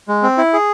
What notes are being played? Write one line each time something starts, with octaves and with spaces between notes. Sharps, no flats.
G#3
C4
E4
G#4